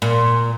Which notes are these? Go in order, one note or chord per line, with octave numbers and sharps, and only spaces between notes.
A#2